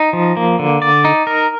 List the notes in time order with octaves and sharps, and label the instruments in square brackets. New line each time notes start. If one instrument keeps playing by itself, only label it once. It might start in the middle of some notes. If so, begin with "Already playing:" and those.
Already playing: [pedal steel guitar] D#4
F3
A#3
D3
D5
D#4
A#4